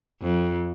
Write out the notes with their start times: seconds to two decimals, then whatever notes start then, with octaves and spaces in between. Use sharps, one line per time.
0.22 F2